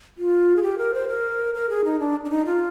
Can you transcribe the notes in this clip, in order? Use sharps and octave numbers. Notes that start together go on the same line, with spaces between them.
F4
G#4
G4
A#4
C5
A#4
A#4
G#4
D#4
D4
D4
D#4
F4